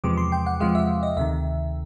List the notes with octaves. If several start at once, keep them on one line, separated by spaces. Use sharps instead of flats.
E2 C3 F3 G#3 D6
C6
G5
F#5
E2 C3 F3 G#3 F5
E5
D#5
D2 C3 D#3 E5